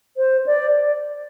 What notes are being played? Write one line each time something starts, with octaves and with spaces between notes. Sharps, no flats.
C5
D5